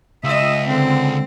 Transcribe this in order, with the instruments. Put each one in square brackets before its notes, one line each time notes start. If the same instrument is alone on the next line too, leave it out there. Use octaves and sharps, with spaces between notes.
[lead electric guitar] C#2 [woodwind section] F4 D#6 E6 [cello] D#5 E5
[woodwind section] D3 [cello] C4